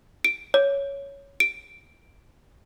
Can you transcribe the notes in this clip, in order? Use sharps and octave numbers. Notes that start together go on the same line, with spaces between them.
D7
C#5
D7